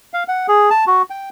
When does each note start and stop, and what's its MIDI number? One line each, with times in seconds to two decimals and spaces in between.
0.14 0.23 77
0.28 0.46 78
0.48 0.70 68
0.70 0.84 81
0.87 1.02 66
1.10 1.29 79